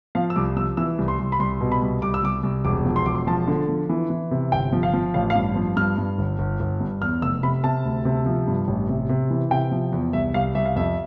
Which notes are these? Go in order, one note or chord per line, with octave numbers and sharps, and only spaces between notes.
F3 F5
E6
C2 D6
F3 E6
E3 E6
C2
C6
C2
B5
C2 C6
B2
B5
C2
C2 D6
E6
C2 D6
C2
E1 D6
F3
C6
E1 D6
C6
F3 A5
D3
F3
E3
E3
C3
G1 G5
F3
F5
F3
A1 F5
F5
G2
F3
G2 F6
G2
G1
G1
G1
G2
E2 F6
F1 E6
C3 B5
C3 A5
D2
C3
F3
G2
A1
C3
C3
E3
C3 G5
F3
E2
C2 E5
C2 F5
C2 E5
F5
F2 E5